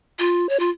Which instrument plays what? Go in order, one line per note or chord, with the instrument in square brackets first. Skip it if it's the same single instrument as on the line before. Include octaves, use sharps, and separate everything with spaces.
[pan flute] F4
C#5
F4